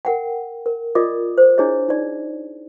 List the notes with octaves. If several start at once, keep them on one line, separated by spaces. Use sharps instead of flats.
A#4 F#5 G5
A#4
F4 A#4 D5 D#5 D6 D#6
C5
D4 E4 G#4 C#5 D#5
D#4 D5